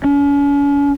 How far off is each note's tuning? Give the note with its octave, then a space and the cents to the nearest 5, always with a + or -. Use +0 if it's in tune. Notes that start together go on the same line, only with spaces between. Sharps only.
C#4 +40